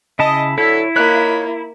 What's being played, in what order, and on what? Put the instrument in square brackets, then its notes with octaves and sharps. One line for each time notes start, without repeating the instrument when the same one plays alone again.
[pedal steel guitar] C#3 E4 A5 [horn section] D#5
[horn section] D3 F#3 A4 [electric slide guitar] E4 [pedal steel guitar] C#5
[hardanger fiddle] A#3 [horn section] D#4 F4 B5 [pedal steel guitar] C#5 F#6